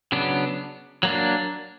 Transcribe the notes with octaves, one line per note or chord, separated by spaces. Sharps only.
C#3 F#3 B3 D4
F#3 A#3 D4